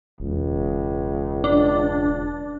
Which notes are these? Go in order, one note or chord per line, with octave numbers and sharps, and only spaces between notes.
E1 C#2
D4